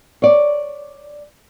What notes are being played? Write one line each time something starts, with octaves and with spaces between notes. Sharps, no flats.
C#5 D5